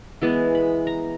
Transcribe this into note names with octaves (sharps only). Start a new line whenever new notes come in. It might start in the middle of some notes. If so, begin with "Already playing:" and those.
E3 G#3 B3 A5
B5
A#5